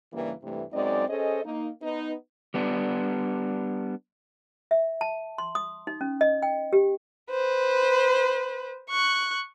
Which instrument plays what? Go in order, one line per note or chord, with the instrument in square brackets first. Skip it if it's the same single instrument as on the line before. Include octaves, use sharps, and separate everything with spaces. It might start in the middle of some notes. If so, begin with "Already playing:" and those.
[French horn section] G2 C#3 E3 G3 A#3
G2 C3 E3 A3
F#2 G#3 C4 D#4 D5
C#4 G#4 A4 C5 D#5
A#3 D#4
B3 D#4 B4
[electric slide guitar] G3 B3 D4
[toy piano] E5
A5
C6
D#6
D#4
C#4
D#5
G5
G4
[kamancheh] B4 C5
C#6 F#6